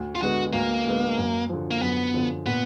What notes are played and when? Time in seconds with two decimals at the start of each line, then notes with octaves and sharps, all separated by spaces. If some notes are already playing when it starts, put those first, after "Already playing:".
Already playing: D2
0.15 F4
0.21 D3 G#3 B3 F#4
0.53 D2 A#3
0.85 D3 G#3 B3
1.17 F#2
1.49 D3 F3
1.71 A#3
1.82 F#2 B3
2.14 D3 F3
2.46 A#2 B3